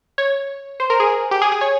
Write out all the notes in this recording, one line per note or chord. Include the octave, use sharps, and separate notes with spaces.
C#5
C5
A#4
G#4
G4
G#4
G#4
C#5